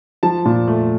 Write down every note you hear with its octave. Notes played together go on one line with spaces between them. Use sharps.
F3 A5
A#2
A3